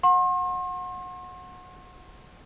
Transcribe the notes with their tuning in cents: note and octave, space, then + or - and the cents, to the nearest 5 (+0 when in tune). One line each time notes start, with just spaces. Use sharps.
F#5 -20 C6 +40